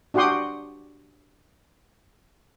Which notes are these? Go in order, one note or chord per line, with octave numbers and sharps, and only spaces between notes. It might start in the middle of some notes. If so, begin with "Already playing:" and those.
D4 F#4 G4 F#5 C6 D#6